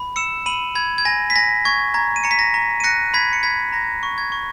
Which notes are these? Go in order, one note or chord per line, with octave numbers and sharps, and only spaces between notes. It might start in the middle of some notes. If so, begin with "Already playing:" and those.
Already playing: B5
E6 C#7 E7
B5 D#7 F#7
B5 G#6
G#6
G#5 A#6
B6
G#5 A#6
C#6 G#6
A#5 G#6
D#7
A#5 C#7
B6
A#6
A#5
D#7
F#6 A#6 C#7
B5 G#6 B6
C#7
B5 G#6 B6
A#5 A#6
C#6
G#6
C#6